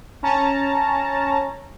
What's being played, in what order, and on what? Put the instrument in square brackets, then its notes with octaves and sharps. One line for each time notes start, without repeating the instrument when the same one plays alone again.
[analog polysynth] C#4 A5 A#5